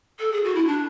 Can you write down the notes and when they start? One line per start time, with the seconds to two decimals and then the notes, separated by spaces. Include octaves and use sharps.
0.20 A4
0.32 G#4
0.44 F#4
0.55 E4
0.67 D4